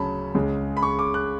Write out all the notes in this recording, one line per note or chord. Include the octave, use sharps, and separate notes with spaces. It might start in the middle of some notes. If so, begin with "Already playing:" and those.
Already playing: D2 C#3 F#3 C#4 A5 B5
C#2 C#3 G#3
B5
C#6
D6
F#6